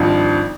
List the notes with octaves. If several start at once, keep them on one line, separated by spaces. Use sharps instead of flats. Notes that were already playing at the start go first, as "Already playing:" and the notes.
Already playing: G#1 G2 F3